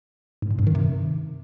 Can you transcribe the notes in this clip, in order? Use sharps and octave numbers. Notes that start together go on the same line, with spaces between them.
G#2
A#2
G2
D#3
C3